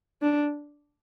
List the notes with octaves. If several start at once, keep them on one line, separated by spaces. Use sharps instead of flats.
D4